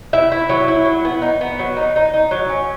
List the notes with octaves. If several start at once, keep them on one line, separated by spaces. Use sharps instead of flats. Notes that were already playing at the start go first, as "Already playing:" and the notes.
E4 E5
E4
F#3
E4
F#3
B3
D#4
B3
F#3
D#4
D#4
D#4
F#3
C#4